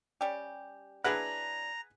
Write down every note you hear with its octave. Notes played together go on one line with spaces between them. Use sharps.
G3 C#4 G4
F#3 D4 E4 G#4 B4 F#5 A#5